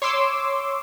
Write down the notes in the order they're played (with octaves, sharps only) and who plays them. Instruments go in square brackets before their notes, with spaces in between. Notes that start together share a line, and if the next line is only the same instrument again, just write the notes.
[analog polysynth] C#5 C6 D6 E6